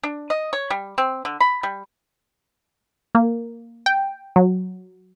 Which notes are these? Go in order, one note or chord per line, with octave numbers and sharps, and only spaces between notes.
D4
D#5
C#5
G3
C4
D3
B5
G3
A#3
G5
F#3